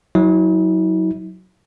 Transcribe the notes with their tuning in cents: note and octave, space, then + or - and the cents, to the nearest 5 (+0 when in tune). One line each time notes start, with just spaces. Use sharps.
F#3 +0 E4 -45